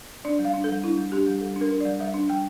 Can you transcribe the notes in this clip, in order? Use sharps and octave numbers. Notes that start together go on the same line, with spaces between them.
D4 D5
G3
F5
D4
G3 A4
D4 E4
G3
D4 G4
G3
G3 A4
D4
A#4
D4
G3 D5
G3 E5
D4
G3 G5